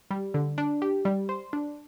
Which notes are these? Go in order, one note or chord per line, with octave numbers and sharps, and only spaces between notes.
G3
D3
D4
G4
G3
C5
D4